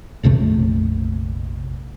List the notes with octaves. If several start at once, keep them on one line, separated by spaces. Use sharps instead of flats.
A#1 F2 C3 A3